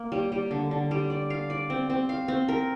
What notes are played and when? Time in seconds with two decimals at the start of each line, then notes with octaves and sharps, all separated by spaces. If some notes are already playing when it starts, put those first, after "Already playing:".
Already playing: A#3
0.12 G3
0.32 G3
0.51 D3
0.71 D3
0.91 G3
1.10 D5
1.30 F5
1.50 D5
1.70 C4
1.90 C4
2.09 F5
2.28 C4
2.49 A#4